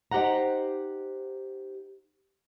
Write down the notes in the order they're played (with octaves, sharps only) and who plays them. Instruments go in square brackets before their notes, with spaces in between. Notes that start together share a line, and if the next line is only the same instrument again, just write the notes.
[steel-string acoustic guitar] D#4 G4 C5 F#5 A#5